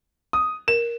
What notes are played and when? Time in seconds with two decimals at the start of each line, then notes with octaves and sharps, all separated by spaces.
0.33 D#6
0.68 A#4 E7